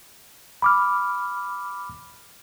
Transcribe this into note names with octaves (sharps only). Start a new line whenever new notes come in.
B5 D6 F6